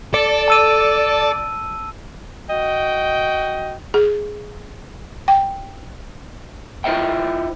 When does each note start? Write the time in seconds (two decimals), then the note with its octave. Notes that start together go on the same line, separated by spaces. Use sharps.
0.14 A4 D5
0.48 A5 E6 D#7
2.50 F#4 D#5 G5
3.94 G#4
5.28 G5
6.84 E4 F4 C5 D#5 E5 G5